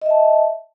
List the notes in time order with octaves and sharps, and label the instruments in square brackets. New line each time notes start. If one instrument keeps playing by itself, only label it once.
[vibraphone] D#5
E5
A5